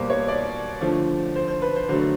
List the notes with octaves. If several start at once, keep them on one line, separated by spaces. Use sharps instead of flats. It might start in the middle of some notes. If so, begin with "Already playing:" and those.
Already playing: B2 G3 A#3 C5
C#5
D5
D3 F3 A3
C5
C5
B4
C5
D3 F#3 A3 C5